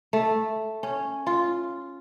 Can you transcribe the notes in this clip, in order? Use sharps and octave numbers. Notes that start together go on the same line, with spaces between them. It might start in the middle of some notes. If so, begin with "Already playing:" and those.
A3
C#4
F4